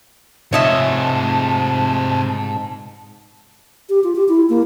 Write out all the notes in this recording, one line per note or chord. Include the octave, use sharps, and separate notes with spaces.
G#2 C3 F4 C#5 D#5 E5 A5
G4
F4
G4
E4
A#3